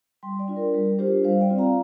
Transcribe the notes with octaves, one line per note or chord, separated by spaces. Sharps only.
G3 G5 C6
D5 G5
D4 F4
A#4
G3 A#4
D4 F4 G4 C5
G3 C5 F5
D5 G5
C4 F4
F5 A#5